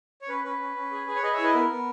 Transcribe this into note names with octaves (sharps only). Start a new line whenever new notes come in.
C#5
C#4 B4
C#4 B4
C#4
C#4
G#4
G#4
C#5
G#4 B4 D#5
C#5 E5
E4
B4 D#5
B3 A#4
B3